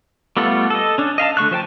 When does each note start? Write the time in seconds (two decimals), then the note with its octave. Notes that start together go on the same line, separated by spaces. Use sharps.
0.37 G3 A3 B3 F4 A4
0.70 A4 D#5
0.98 C#4 D4
1.18 D#5 F5 G#5 A5
1.37 D3 A3 C#6 F#6
1.51 F3 C5 G5 A5